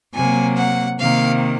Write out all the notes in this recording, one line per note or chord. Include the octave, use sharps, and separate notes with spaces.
C3 F#3 A#3 G#5
F#5
C3 D#3 A#3 F5